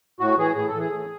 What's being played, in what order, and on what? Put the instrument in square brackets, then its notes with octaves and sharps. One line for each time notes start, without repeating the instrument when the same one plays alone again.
[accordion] A2 F#4
E3 G#4
A2 G#4
A4
E3 G#4
A2